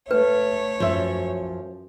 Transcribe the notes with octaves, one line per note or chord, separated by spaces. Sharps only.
A3 B4 C#5
F#2 F3 E5